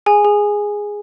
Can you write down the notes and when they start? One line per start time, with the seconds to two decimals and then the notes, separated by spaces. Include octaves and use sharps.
0.06 G#4 G#5
0.25 G#4